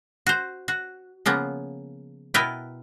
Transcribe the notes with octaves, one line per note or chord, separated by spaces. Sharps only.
F#4 C5
F#4
C#3 F3 A#3 B3
B2 B3 E4 A#4 B4 G5